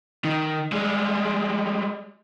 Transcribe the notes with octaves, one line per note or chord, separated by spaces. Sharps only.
D#3
G3 G#3